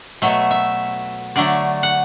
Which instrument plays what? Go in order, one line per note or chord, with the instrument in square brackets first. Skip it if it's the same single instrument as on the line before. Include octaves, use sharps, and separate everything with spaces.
[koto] B2 F#3 A3 E5
E5
D3 F#3 A3 D5
F#5